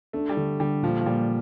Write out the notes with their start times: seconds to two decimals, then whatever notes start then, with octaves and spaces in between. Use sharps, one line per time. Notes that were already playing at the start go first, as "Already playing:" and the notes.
0.13 A3 D4
0.29 G3
0.36 D3 A3
0.60 D3 G3
0.83 A#2 F3
1.01 F3
1.06 A#2 G3